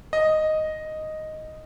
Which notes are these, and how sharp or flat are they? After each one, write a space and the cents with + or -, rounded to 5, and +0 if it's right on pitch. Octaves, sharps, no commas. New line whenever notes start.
D#5 +0